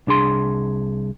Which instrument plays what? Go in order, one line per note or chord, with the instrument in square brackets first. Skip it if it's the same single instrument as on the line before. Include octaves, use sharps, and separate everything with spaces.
[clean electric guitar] C2 D4 G#4 C6